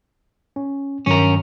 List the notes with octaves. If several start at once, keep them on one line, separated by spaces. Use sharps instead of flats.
C#4
G2 D#3 F#3 C#4 A#4